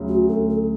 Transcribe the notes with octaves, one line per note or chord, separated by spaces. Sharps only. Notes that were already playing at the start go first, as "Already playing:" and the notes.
Already playing: D2 C#3 F#3
F#4
D2 A4
A4